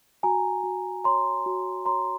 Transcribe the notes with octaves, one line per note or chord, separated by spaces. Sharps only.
F#4 G#5 A#5
F#4
C#5 A#5 C6
F#4
C#5 A#5 C6